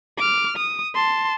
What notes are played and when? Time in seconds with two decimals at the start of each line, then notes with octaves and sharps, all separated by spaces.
0.17 D6 F6
0.56 D#6
0.95 A5 C6